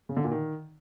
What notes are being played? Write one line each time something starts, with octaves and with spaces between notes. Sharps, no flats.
C#3
D3
A#2
D#3